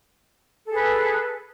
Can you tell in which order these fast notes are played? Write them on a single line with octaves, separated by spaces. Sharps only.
A4 G#4 B4